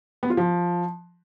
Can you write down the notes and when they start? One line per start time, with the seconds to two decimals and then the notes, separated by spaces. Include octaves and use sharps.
0.23 B3
0.30 F4
0.37 F3